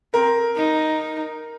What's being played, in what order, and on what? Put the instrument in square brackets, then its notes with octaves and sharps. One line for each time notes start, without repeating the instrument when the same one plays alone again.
[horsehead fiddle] C4 [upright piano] A#4
[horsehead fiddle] D#4